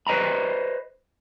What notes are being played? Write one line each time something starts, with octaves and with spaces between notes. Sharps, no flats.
B4 C5 D#5 A#5 B5